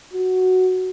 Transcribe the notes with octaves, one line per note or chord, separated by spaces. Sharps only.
F#4